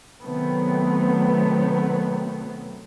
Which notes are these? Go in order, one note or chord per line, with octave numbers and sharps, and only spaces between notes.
C3 D#3 F#3 A3 B3 C4